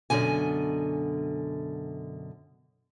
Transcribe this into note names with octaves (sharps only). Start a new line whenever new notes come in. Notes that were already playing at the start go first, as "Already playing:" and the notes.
F#2 B2 D3 G#5